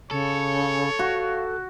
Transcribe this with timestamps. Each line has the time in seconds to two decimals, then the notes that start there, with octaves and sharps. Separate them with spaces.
0.11 C#3 A4 C#5
0.99 F#4 F5